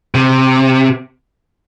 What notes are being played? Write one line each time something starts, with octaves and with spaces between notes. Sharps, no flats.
C3